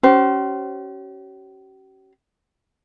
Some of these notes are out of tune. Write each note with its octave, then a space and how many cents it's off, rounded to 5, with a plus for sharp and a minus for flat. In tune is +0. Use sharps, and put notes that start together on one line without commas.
C#4 +0 G4 -45 C5 +0